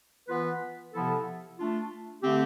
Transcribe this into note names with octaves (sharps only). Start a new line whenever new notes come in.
E3 B3 F4 B4
C3 F3 B3 E4 A4
A3 D4 F4
D3 A3 C4 G4